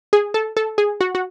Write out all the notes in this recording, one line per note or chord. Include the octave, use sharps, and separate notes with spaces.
G#4
A4
A4
G#4
F#4
F#4